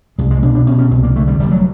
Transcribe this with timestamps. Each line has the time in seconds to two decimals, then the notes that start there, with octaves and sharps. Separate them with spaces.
0.18 C2 G#3
0.31 G#3
0.42 B2 D4
0.55 D4
0.67 B2 C#4
0.79 C#4
0.91 C2 C4
1.03 A#3
1.16 D3 A3
1.28 G3
1.39 F1 G3
1.52 F#3